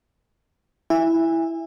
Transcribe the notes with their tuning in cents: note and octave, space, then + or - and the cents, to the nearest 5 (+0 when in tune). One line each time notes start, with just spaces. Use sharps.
E4 +0 E5 +10 G#5 -30